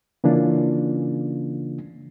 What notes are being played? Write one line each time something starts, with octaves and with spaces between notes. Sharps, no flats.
C#3 E3 A#3 C#4 D4 F4